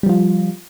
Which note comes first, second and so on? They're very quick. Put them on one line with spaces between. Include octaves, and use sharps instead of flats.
G3 F3 F4